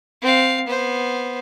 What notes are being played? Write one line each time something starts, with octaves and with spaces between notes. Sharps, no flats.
C4 F5
B3 C5